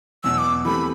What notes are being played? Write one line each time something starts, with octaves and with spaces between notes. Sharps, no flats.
E2 B2 F#3 E6
D6
E3 A3 C4 G4 B5